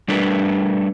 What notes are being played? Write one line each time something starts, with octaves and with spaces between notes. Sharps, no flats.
G3 A3 D4 A#4 B4